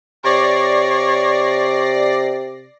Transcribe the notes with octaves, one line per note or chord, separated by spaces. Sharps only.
C3 C#5 D5 A#6 C7